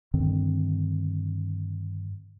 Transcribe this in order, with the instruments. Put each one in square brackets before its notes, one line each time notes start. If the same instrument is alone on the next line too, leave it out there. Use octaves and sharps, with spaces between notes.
[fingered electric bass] G2 D3 D#3 C4